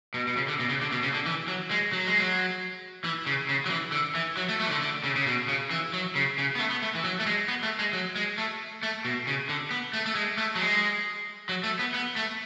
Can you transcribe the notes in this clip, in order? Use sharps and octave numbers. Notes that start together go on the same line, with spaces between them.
B2
B2
C#3
D3
B2
C#3
D3
B2
C#3
D3
E3
F#3
G#3
F#3
G#3
F#3
E3
C#3
C#3
F#3
E3
D3
E3
F#3
A3
A3
E3
D3
D3
C#3
C#3
B2
C#3
E3
F#3
C#3
C#3
B3
A3
B3
A3
E3
F#3
A3
G#3
B3
A3
G#3
F#3
G#3
A3
A3
B2
C#3
D3
B3
A3
A3
G#3
A3
F#3
G#3
F#3
A3
B3
B3
A3